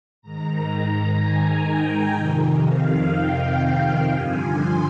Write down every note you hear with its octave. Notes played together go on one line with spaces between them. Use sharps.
G#2 D#3 A#5
G#5
G5
F2 C3 D#3
F5
G5
G2 D3 F3 G#5
C6